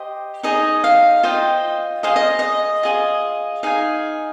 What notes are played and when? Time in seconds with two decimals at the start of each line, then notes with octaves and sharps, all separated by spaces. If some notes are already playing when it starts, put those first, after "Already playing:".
Already playing: G4 C5 D#5
0.43 D#4 G#4 C#5 D#5
0.84 F5
1.23 F4 C5 D#5 G5
2.03 G#4 C5 D#5 F5
2.16 D#5
2.39 D#5
2.83 F4 G#4 D#5
3.63 D#4 G#4 C#5 F5